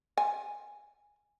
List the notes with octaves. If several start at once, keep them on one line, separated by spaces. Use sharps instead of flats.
G#5